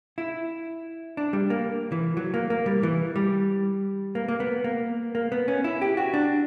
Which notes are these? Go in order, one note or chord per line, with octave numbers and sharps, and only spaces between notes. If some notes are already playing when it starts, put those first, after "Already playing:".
E4
D4
G3
A#3
E3
F#3
A#3
A#3
G3
E3
G3
A#3
A#3
B3
A#3
A#3
B3
C#4
E4
G4
F#4
D4